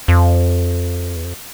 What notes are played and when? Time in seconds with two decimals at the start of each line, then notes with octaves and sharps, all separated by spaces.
0.08 F2
1.16 E2
1.24 F2